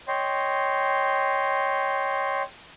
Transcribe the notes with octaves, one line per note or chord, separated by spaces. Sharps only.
C#5 D#5 G5 C6